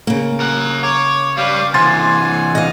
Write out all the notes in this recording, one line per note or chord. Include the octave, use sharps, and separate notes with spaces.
C#3 A#3
A#4 F#5
C#5 D6
G3 B4 F5 D6
C3 E3 F#5 G#5 C6 A6
D#5 F5